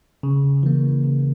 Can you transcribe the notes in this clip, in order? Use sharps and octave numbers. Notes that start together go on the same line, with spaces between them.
C#3
E3 A#3
C#3